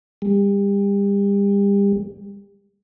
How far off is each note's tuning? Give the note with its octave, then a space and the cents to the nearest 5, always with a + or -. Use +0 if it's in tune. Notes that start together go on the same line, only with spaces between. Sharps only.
G3 +35